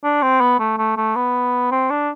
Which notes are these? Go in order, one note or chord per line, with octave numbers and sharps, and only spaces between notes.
D4
C4
B3
A3
A3
A3
B3
C4
D4